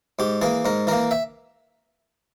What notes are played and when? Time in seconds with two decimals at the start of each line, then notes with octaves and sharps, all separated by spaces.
0.19 G#2 G4
0.42 E3 A#3 G#4
0.65 G#2 A#4
0.87 E3 A#3 A#4
1.11 E5